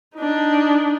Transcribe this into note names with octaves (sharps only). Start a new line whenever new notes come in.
D4 D#4